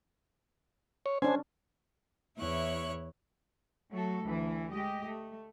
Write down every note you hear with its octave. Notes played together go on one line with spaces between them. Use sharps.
C#5
C#4 D4 C5 G#5
E2 E4 C#5 C#6 F#6
F#3 A3 F#4 A4
D2 E3 E4
G#3 G4 D#5
A3